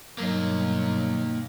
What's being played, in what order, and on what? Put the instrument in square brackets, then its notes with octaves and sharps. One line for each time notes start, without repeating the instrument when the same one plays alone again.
[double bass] G2 B2 [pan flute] F#3 [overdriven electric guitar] A#3 D#4